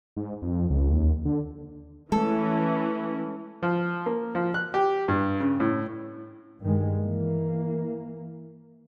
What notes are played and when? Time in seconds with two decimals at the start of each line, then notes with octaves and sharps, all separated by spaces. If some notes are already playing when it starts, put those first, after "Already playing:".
0.17 G#2
0.42 F2
0.70 C#2
0.90 D#2
1.25 D3
2.12 E3 G#3 A3 C#4 A4
3.63 F3
4.06 A#3
4.35 F3
4.54 F#6
4.74 G4
5.08 G2
5.40 C#3
5.60 A2
6.62 G2 D#3 G#3
7.00 E3 A#3